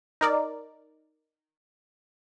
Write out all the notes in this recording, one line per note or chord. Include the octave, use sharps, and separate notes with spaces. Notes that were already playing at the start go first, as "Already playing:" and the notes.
D#4 A#4 D5